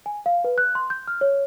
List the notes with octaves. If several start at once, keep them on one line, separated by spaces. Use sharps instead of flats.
G#5
F5
B4
F#6
C6
G6
F6
C#5